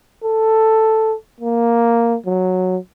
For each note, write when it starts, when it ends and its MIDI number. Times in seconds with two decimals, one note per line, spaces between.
0.24 1.15 69
1.40 2.16 58
2.26 2.77 54